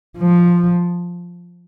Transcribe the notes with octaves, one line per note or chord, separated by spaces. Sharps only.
F3